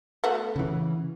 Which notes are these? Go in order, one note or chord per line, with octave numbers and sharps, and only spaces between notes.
A3 B3 F#4
C#3 E3